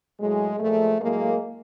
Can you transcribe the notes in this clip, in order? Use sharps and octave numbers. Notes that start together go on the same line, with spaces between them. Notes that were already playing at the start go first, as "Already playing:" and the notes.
A2 F#3 G#3
A#2 F3 G#3 A3
A2 F#3 G#3 A#3